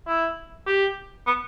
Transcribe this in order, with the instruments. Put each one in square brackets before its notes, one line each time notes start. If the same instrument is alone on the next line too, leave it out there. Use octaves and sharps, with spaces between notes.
[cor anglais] E4
G4
B3